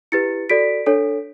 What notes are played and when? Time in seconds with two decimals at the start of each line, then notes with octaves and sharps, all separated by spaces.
0.12 E4 G4 B4 A6 C#7
0.50 F#4 A4 D5 B6 D7
0.86 D4 A4 C#5